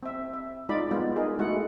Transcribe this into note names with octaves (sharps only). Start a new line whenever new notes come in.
C4 E5
E5
G#3 D#4 F4 D5 B5
G#3 B3 F4
D#4 G#4 A#4
G#3 A3 E4 F#4 F#5